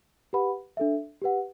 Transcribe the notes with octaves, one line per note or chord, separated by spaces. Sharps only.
G4 B4 F#5 B5
D4 A4 E5
G4 B4 F#5